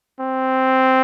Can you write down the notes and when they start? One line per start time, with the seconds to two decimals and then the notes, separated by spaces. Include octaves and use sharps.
0.20 C4